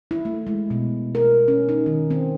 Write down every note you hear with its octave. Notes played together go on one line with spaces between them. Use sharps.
E4
A3
G#3
B2
A#4
C#4
D#4
D#3
C4